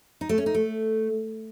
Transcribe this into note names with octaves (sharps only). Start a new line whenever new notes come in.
D#4
A3
C#4
D#4
A3